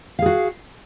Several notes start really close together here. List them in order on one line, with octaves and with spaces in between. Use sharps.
F5 G#4 F#4